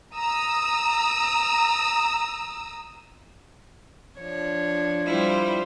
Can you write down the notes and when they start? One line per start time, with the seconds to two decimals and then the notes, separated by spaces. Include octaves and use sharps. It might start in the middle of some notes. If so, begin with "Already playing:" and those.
0.14 A#5 D#6 E6
4.19 F3 D4 C#5
5.06 G3 E4 F4 C5